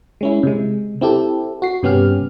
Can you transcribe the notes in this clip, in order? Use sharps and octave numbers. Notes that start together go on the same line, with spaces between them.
G#3 C#4 E4
C3 G#3
C4 E4 G4 A4
F#4 C7
G2 C3 B3 C#4 G4 F6